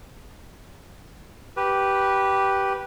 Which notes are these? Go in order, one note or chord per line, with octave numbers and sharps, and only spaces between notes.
G4 B4